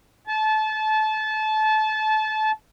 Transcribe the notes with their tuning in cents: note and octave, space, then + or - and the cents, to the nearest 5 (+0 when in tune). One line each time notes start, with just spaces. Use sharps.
A5 -25